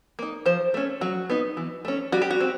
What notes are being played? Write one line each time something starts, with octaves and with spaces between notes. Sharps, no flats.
A#3 D#4
F3 C5
A3 C#4
F#3 F#4
B3 D#4
E3
A3 C#4
G3 F#4
G4
F#4
C4